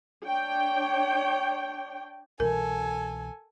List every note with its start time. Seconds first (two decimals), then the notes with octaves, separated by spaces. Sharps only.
0.24 D4 C#5 G5
2.40 C2 B2 E3 A4 A#4 G#5